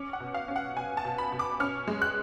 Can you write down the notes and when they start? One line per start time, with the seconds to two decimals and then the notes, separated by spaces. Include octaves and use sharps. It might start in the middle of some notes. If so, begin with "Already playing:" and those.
Already playing: C#4 D6
0.13 F#5
0.20 B2
0.34 F5
0.48 C#4
0.56 F#5
0.76 B2 G#5
0.97 A5
1.05 B2
1.18 B5
1.32 B2
1.39 D6
1.60 C#4 F6
1.88 G#3
2.02 F#6